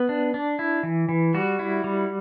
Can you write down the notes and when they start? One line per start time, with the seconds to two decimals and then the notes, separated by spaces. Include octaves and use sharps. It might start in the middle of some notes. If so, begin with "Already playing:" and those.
Already playing: B3
0.09 D4
0.34 D4
0.59 E4
0.83 E3
1.09 E3
1.34 G3 F#4
1.59 E4
1.84 G3